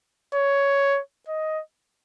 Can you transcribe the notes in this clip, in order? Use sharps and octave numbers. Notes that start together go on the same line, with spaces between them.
C#5
D#5